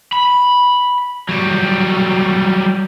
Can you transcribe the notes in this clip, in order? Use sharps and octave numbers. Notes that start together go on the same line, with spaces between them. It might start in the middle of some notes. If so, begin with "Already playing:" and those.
B5
F#3 G3